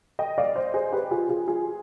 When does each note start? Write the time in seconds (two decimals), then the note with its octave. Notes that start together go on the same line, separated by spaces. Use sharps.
0.19 D#5 G5
0.38 D5 F5
0.55 C5 D#5
0.74 G#4 C5
0.92 G4 B4
1.11 F4 G#4
1.29 F4 G#4
1.47 F4 G#4